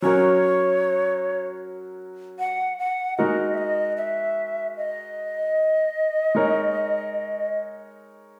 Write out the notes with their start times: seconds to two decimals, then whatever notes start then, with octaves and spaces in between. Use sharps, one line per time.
0.02 F#3 C#4 F#4 A#4 C#5
2.39 F#5
2.79 F#5
3.18 G#3 D#4 F#4 A#4 D#5
3.54 E5
3.58 D#5
3.97 E5
4.77 D#5
6.35 G#3 D#4 A#4 C#5